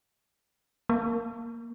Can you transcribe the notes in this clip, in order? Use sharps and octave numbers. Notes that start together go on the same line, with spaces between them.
A#3